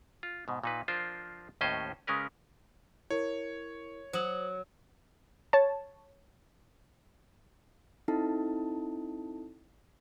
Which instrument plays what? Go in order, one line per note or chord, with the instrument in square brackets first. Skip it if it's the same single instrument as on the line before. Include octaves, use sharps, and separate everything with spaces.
[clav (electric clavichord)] F4
G#2 B2
A#2 D#4 B4
F3 D4 F4 A#4 C5
D#2 A2 C#4 C5 D#5
C#3 G#3 C#4 A#4 B4
[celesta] E4 A#4 [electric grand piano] C#5
[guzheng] F#3 [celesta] C5 D#6 F#7
[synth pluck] C#5 A5
[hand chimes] C4 D#4 E4 A4 A5